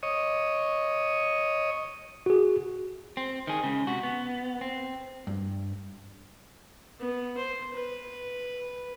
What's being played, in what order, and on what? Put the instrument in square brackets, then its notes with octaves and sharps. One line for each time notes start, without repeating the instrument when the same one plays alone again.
[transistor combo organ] C#5 D#5
[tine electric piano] F#4 G#4
[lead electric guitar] C4
D#3 G#4
C#2 C#3
C3 F#4
B3
C4
[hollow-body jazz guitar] G2
[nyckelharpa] B3
C5
B4